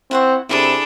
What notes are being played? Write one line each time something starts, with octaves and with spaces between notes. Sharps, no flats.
C4 E4 F#5 C#6
C3 D4 E4 G#4 A4 B5